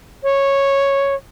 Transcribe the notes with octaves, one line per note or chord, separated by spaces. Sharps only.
C#5